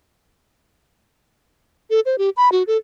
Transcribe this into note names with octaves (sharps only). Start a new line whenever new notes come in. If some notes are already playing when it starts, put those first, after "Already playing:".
A4
C5
G4
B5
F#4
A4